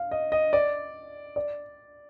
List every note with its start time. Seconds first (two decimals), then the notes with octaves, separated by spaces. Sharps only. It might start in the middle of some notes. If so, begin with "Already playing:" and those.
Already playing: F5
0.11 D#5
0.32 D#5
0.53 D5
1.36 D5